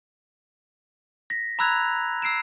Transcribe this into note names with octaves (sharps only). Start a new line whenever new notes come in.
A#6 B6
A#5 B5 E6 F#6 G#6 F7
E6 C7 D7 E7